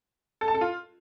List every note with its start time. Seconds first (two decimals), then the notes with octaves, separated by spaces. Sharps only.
0.41 A4
0.48 A5
0.55 A4
0.61 F4